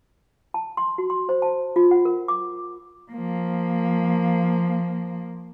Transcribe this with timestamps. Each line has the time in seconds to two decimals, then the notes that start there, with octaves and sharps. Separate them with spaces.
0.54 A5
0.77 C6
0.98 F#4
1.10 C6
1.29 C5
1.42 A5
1.76 F4
1.91 F#5
2.05 A#4
2.28 D6
3.11 F3 A#3